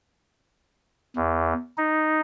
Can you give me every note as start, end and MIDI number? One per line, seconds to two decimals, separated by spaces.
1.16 1.54 40
1.78 2.21 63